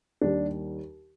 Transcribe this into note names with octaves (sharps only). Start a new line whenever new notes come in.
D#2 D#3 G3 D4